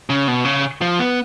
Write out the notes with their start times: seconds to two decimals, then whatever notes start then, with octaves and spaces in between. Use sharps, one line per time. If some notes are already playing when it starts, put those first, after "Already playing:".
0.10 C#3
0.28 B2
0.45 C#3
0.82 F3
0.99 B3